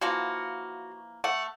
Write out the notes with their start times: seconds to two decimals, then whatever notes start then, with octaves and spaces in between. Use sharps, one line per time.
0.01 E3 F3 A#3 F#4
1.24 A3 F#5